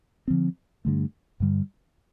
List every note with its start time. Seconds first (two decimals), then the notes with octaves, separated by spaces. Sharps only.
0.28 D3 F3 C4
0.85 G2 D3 A3
1.40 G2 D3 G3